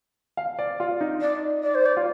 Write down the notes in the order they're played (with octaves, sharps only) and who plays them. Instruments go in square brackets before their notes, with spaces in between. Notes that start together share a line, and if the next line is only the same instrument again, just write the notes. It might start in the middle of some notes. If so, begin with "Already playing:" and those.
[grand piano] F5
D5
F4
D#4
[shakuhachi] D5
D5
C5
D5
[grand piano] F4